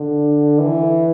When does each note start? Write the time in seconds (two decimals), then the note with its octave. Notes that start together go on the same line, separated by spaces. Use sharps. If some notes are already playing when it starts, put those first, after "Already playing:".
Already playing: D3
0.60 E3